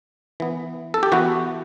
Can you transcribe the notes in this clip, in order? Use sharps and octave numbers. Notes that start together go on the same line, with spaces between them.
E3 B3
A4
G4
E3 B3 F#4